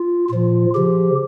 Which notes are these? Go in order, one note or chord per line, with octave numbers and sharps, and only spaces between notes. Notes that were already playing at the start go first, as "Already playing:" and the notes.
Already playing: F4
A#2 F3 F4
C#3 F3 G4